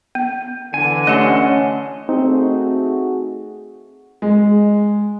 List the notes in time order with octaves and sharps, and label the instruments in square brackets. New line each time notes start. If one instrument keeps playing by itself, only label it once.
[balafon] B3
[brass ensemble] D3 E3 [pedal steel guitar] G#5
[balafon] A3 G4 [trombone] C#4 [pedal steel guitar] D#5 F#5 C6
[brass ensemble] A3 F#4 G#4 [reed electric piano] C4 D#4
[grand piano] G#3